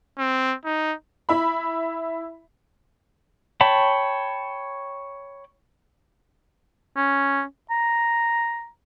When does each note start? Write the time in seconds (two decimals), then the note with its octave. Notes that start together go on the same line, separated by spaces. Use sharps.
0.18 C4
0.65 D#4
1.29 E4 E5 B5
3.61 C#5 G5 A5 B5
6.97 C#4
7.71 A#5